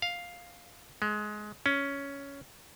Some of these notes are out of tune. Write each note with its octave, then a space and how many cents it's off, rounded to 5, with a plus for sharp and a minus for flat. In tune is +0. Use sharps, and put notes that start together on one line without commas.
F5 +5
G#3 +20
C#4 +10